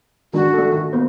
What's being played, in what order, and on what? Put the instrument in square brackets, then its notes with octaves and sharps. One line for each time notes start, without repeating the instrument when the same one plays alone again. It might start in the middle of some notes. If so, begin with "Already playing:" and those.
[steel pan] D#3 G#3 D4 [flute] F#4
[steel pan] A3 A4
D#3
A#3 B3 C5